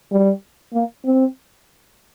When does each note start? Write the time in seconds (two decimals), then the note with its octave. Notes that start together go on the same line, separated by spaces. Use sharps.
0.12 G3
0.73 A#3
1.06 C4